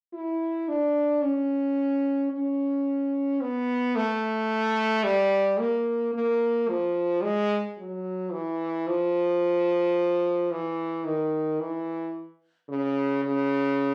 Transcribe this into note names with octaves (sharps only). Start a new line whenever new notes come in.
E4
D4
C#4
C#4
B3
A3
G3
A#3
A#3
F3
G#3
F#3
E3
F3
E3
D#3
E3
C#3
C#3